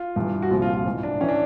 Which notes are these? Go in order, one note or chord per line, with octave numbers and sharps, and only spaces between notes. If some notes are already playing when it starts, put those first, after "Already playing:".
Already playing: F4
G2 E3
F#4
C2 A#2 F3 F4
F4
F4
G#2 E3
D4
E3 C#4
D4